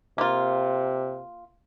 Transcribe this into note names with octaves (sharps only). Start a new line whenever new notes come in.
C3 A#3 F4